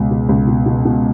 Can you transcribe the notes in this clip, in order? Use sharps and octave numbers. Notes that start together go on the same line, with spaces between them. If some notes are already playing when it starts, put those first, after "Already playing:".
Already playing: C#2 B2
B2
C#2
B2
B2
B2